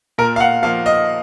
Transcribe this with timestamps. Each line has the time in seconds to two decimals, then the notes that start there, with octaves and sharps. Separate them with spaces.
0.18 A#2 A#4
0.36 F5
0.40 F#5
0.62 F3 A#3 F5
0.86 D#5